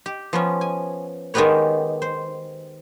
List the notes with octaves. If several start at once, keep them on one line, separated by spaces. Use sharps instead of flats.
G4
F3 B3 C#4
G#5
D#3 G#3 B3 G4 B4 C#5
C5